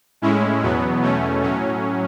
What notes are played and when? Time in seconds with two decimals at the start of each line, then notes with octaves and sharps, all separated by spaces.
0.22 A2 G#3 C#4 E4
0.62 E2 B2 F#3 B3
1.03 E2 B2 A3 C#4
1.42 A2 F#3 C#4